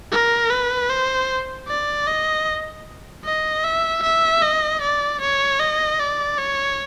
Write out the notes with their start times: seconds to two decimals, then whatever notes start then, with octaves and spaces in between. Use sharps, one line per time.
0.11 A#4
0.50 B4
0.89 C5
1.68 D5
2.07 D#5
3.24 D#5
3.64 E5
4.03 E5
4.42 D#5
4.81 D5
5.21 C#5
5.60 D#5
5.99 D5
6.38 C#5